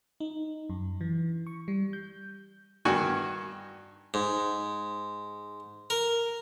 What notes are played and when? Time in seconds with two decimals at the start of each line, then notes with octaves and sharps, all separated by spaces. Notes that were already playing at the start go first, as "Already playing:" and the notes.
0.20 D#4
0.70 F#2
1.01 E3
1.47 C#6
1.68 G3
1.93 G6
2.85 G2 D#3 F#4 G5 G#5 C#6
4.14 G#2
5.90 A#4